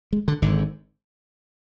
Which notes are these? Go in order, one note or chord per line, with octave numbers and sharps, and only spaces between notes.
G#3
D3
G#1 G#2 D3